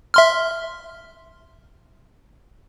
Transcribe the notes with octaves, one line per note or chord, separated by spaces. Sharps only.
E5 C6 F6